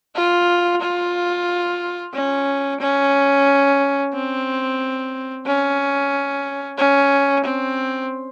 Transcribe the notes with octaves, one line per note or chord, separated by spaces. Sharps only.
F4
F4
C#4
C#4
C4
C#4
C#4
C4